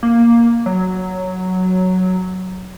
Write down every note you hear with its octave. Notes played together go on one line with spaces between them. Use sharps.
A#3
F#3